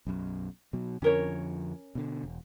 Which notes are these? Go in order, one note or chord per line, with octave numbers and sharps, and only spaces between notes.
B1 F#2
B2 F#3
F2 D3 F3 C#4 A#4 C#5
B2 D3
E1